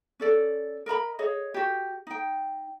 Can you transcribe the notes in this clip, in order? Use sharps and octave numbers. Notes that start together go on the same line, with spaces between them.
C#4 A4 D5
A#4 D#5 A#5 B5
G#4 C#5 D#5
F#4 G4
D#4 G5